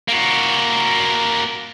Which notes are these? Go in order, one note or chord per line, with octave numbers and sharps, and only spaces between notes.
A#3 F#4